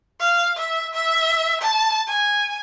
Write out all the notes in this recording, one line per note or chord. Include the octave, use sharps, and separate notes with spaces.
F5
E5
E5
A5
G#5